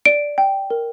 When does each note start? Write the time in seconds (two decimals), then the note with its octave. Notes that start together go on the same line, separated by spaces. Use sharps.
0.05 D5 D7
0.38 G5
0.70 A#4